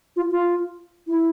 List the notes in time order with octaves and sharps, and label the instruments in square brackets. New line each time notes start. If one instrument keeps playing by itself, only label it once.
[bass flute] F4
F4
E4